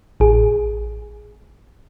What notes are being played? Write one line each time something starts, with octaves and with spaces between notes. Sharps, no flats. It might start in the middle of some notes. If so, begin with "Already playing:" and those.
A1 G#4